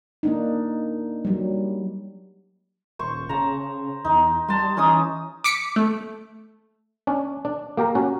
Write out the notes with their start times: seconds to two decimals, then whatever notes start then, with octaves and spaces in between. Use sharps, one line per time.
0.23 A#3 D4 D#4
1.25 F#3 G3
2.99 D#1 C5 C#6
3.29 C#3 A5 A#5
4.05 E2 D#4
4.48 G3 A5 C6
4.77 E3 C#4 D#4 D#6
5.44 D6 B6 C#7 D7
5.76 A3
7.07 C#4 D4
7.45 D4
7.77 A#3 G4 A#4 A#5
7.95 C#4 F#4